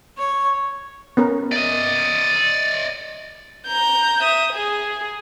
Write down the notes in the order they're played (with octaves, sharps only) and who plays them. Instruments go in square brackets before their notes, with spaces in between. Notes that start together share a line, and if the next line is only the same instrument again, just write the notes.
[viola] C#5
[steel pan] B3 C#4 A#4
[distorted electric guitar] D5 D#5
[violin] A#5 G6
E5 D#6
G#4